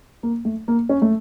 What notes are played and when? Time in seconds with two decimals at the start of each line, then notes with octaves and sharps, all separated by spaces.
0.23 A#3
0.45 A3
0.68 A#3
0.89 C#4
1.02 A3